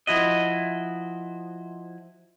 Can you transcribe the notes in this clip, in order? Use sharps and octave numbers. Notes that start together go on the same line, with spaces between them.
F3 E4 F#4 D#5